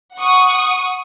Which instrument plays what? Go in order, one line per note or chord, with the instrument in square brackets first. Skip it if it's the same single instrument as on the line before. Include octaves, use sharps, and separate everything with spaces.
[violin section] F#5 C#6 D#6